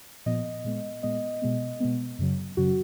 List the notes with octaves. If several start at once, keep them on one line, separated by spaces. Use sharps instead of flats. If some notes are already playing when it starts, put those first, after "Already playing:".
A#2 F3 B3 D#5
A#2 G#3 B3
A#2 G#3 B3 D#5
B2 G#3 B3
B2 G#3 B3
F#2 C#3 F#3
F#2 C#3 F#3 F#4